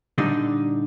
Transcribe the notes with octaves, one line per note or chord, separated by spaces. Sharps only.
A#2 D3 G3 D#4